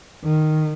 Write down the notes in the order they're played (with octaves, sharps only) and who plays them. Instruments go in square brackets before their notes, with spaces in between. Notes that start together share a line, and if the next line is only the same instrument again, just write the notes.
[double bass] D#3